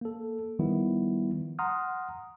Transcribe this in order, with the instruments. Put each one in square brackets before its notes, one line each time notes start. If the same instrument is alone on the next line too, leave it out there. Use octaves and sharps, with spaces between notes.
[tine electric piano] A#3 A4
D#3 F3 G3 B3 E4
F#5 A#5 C6 D#6 F6